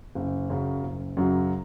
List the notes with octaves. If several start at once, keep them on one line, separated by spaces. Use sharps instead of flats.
F#1
F#2 C#3 F#3
F#1
F#2 C#3 F#3